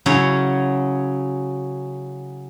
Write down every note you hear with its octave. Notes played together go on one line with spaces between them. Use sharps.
C#3 F#3 C#4 E4 C#5